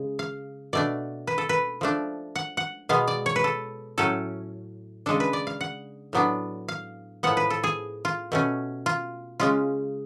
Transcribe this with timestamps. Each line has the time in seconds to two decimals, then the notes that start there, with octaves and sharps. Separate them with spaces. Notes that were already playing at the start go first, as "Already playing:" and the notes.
Already playing: C#3 G#3
0.19 F5
0.73 B2 A3 D4 D5
1.27 B4
1.38 A4
1.49 B4
1.81 F3 A3 D4
2.36 F#5
2.57 F#5
2.89 B2 G#3 B3 F5
3.07 D5
3.26 C#5
3.36 B4
3.44 A4
3.98 A2 F#3 A3 C#4 A4
5.06 C#3 G#3 D4 A4
5.20 B4
5.33 D5
5.47 F5
5.61 F#5
6.13 A2 F#3 B3 D4
6.68 F5
7.23 A2 F3 B3 F#5
7.37 B4
7.50 A4
7.64 G#4
8.05 F4
8.32 B2 A3 C#4
8.86 F4
9.40 C#3 G#3 C#4 F4